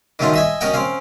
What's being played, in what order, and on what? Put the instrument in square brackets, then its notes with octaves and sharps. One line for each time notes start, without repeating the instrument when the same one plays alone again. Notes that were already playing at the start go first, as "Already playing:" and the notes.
[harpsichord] D#3 F#3 A3 C#4 D#4 F4
D#5 E5 G#5
C#4 F#4 A#4 D#5 F#5 G5
C4 C#4 F5